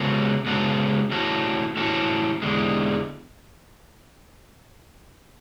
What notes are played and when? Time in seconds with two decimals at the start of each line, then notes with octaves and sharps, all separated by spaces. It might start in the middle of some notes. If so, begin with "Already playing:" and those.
Already playing: C#3 G#3 B3 F#4 A4
0.46 C#3 G#3 B3 F#4 A4
1.11 E3 A3 C#4 F#4 A4
1.76 E3 A3 C#4 F#4 A4
2.42 E2 D3 G#3